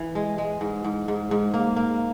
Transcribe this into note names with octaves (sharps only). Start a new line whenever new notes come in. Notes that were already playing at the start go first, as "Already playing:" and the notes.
Already playing: E3 E4
G#3
G#3
G#2
G#2
G#2
G#2
A#3
A#3